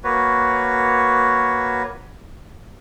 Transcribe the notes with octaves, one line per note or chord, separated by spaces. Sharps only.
A#3 F#4 B4 C#5